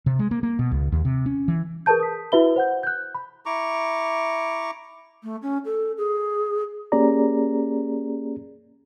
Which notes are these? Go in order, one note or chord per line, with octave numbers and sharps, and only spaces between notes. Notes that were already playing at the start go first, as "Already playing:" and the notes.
C3
G#3
A#3
A#3
B2
C#2
D#2
C3
C#4
E3
G#4 A#4 B4 A5 G6
D#6 B6
E4 F#4 B4 E5 B5 G7
C5 F#5 G6
F#6 G6
B5
E4 A#5 C#6 D6
A3
C#4
A4
G#4
A#3 C#4 G4 G#4 D5 A#5